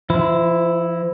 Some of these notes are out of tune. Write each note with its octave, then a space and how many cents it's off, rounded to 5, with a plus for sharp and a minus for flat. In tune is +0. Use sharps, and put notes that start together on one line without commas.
F3 -35 E4 +0